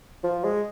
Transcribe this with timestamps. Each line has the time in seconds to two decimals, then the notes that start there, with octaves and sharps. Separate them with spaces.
0.24 F3
0.44 G#3